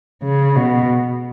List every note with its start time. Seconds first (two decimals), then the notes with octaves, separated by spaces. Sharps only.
0.23 C#3
0.56 B2